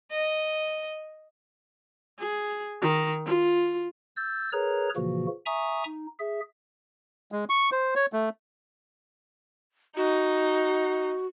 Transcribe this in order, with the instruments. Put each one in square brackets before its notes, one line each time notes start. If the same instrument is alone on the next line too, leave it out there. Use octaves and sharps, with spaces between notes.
[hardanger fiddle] D#5
[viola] G#4
D#3
F4
[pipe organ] E6 G6 A6
G#4 A#4 B4 C#5 A#5
A#2 C#3 E3 F3 A#3 F#4
E5 G#5 A#5 C#6 D#6
D#4
G#4 E5
[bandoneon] G#3
C#6
C5
C#5
A3
[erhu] D#4 [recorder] F#4